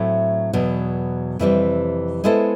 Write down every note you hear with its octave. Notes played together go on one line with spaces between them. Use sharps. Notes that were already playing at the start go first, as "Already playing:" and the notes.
Already playing: A2 F#3 A3 C4 E4
E2 B2 F#3
F2 C3 E3 G3 C4
G#3 B3 E4 A4 C5